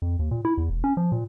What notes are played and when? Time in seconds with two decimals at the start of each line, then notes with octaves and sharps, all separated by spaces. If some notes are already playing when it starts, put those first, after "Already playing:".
0.02 F2
0.19 D#2
0.31 A#2
0.45 E4
0.57 E2
0.70 E1
0.84 C#4
0.97 F3
1.12 A#2